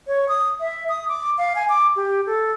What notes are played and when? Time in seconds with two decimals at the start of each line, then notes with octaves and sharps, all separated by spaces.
0.07 C#5
0.28 D#6
0.60 E5
0.89 D#6
1.08 D6
1.38 F5
1.55 G#5
1.69 D6
1.96 G4
2.26 A4